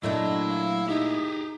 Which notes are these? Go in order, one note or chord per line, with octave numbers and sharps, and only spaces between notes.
A#2 F#3 A3 D4 E4 D#5
F5
D#4 G4 G#4